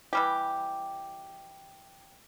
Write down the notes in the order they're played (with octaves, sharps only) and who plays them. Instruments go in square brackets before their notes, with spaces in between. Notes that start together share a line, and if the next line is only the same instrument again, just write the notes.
[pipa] E3 G3 G4